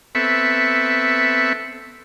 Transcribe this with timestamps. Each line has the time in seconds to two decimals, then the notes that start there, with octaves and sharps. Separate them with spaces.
0.15 B3 C4 A4 E5 B5 C#6